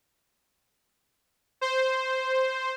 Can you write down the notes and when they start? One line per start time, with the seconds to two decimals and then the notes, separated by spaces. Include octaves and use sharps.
1.61 C5